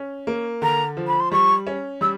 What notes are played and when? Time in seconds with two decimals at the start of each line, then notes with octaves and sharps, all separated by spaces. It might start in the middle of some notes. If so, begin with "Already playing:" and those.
Already playing: C#4
0.27 A#3
0.62 D3 A#5
0.97 F3
1.07 B5
1.20 C6
1.32 G3 C#6
1.67 C#4
2.01 G3 E6